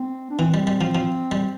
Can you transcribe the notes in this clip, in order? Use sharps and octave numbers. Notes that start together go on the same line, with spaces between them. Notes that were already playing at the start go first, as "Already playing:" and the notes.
Already playing: C4
D4
E3 C4
G3
G3
F3
F3
G3